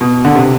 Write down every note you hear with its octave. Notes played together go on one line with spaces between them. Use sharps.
B2
D3
C3